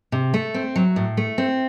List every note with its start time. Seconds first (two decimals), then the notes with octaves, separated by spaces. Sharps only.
0.12 C3
0.34 A3
0.54 C4
0.76 F#3
0.96 A2
1.17 A3
1.38 C4